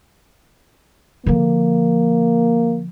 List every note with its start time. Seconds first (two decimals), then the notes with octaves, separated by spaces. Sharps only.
1.26 D3 F3 A#3